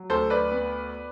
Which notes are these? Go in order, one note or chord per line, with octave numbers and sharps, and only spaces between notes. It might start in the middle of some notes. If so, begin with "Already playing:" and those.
Already playing: F#3
D2 A4 C5
B4 D5
B3